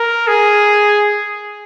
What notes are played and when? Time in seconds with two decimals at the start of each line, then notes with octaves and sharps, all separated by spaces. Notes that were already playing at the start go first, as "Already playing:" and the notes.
Already playing: A#4
0.28 G#4